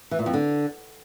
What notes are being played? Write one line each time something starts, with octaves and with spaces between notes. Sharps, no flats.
E3
A#2
F2
D3